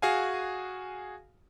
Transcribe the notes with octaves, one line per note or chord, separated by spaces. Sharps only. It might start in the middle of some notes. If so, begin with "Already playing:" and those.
F#4 G#4 F5 G#5